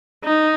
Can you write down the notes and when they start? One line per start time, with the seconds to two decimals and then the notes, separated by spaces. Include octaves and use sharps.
0.25 D#4